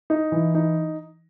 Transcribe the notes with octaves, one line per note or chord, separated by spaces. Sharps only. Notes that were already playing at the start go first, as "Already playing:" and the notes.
D#4
E3
D#4